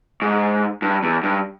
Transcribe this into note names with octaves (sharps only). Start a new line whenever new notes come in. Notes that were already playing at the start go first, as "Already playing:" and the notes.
G#2
G2
E2
G2